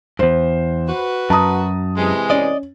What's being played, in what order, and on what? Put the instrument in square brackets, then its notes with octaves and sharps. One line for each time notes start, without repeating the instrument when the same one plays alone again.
[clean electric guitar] E2 G2 [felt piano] C5
[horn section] F#4 B4
[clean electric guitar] F#2 [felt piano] A5 A#5 D#6
[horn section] C3 E3 G#3
[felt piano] C#4 [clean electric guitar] D5 D#5